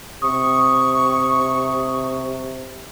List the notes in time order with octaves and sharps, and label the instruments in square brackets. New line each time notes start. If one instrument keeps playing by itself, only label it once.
[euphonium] C3 [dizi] C#6 [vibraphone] D#6